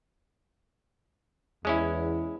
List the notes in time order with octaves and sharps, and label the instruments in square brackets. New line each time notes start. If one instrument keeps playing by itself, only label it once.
[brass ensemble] E2 [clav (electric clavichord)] G#3 C#4 E4